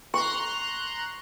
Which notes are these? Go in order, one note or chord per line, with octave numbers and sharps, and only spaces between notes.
A#5 C6 C#6 F#6